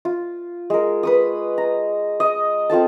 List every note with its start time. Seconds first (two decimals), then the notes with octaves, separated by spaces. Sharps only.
0.05 F4
0.70 G#3 A#4
1.03 B4 C#6 D#6
1.58 A#5
2.20 D#5
2.70 C4 F4 A4 A5